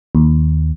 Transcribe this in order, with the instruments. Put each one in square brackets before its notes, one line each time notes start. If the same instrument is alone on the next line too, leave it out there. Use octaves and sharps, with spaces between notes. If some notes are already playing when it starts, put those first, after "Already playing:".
[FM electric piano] D#2